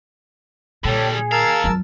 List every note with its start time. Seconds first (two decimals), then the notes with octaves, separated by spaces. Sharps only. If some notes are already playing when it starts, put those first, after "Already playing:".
0.85 A#2 D3 G3 A4 C#5 G5 A5
1.12 G#4
1.32 D#2 A#4 F5 A5 E6
1.64 F2 F#3